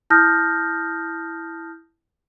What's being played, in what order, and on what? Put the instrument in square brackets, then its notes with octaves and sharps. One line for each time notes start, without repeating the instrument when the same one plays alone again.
[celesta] E4 A5 D#6 F6 G6 A#6